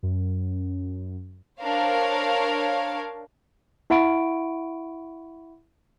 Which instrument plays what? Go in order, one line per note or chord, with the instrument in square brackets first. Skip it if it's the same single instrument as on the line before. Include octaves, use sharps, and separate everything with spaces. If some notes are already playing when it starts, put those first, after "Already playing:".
[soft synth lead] F#2
[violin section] D4 A#4 C5 C#5 F5
[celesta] E4 E5 F#5 B5 C#6 D7